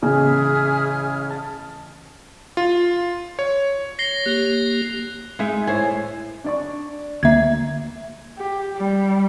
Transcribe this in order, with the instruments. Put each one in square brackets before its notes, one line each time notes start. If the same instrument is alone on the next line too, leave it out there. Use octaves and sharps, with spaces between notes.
[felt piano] A1 C#3 G#5 [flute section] G#4 E5 F6
[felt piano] A5
[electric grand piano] F4
C#5
[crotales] A#6 C7 G7
[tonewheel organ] A#3 G4 [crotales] F#6
[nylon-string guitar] G#3 D#4 E5
A2 C5 C#5 G#5
[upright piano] D4 D5 C#6
[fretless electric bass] D2 A#3 [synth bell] E5 G#6
[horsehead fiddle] G4
G3